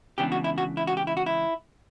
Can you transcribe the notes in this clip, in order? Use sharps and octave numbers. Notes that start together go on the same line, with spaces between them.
C#2 C#3 E3 B3 D4 G4
F#4
E4
F#4
E4
F#4
G4
E4
F#4
E4